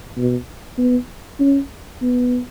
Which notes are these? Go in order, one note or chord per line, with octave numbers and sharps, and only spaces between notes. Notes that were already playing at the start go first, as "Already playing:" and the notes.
B2
B3
C#4
B3